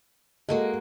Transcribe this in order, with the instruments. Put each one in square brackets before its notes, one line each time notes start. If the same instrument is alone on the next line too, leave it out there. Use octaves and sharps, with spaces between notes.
[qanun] G#3 A#3 F#4 [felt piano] A4 D#5